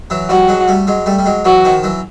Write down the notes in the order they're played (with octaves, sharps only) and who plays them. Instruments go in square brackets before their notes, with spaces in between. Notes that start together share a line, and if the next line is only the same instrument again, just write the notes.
[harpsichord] E3 F#3
[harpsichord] F3 G3 [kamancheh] F#4
[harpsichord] F#3 G#3
G3 A3
F#3 G#3
G3 A3
G3
F#3 G#3
[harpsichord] E3 F#3 [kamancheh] F#4
[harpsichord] D#3 F3
E3 F#3